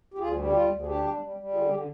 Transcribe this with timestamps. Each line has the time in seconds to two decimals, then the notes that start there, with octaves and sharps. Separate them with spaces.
0.14 G4
0.18 D2 F4 G#4
0.35 G3
0.47 G4
0.52 D2 F4
0.69 D2
0.82 G#4
0.86 D4 G4
1.04 G3
1.20 G3
1.37 G3
1.54 D3 F4 G#4
1.66 G#4
1.70 D3 G4